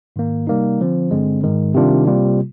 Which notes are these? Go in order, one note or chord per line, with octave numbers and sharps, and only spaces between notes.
G#2 D#3 A#3
C3 G3 A#3 D#4
D3 F3 C4
G2 D3 G#3 C4
G#2 D#3 G#3
C3 D#3 G3 D4 F4
C3 G3 A#3 F4